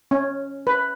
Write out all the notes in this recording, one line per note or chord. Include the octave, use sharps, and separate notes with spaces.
C#4
B4